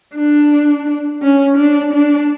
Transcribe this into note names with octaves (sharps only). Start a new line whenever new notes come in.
D4
C#4
D4
D4